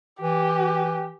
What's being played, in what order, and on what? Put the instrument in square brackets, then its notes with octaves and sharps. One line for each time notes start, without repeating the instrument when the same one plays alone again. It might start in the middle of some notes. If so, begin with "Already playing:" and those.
[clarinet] E3 [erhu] G4